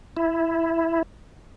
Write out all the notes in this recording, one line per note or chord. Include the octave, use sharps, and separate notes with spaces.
E4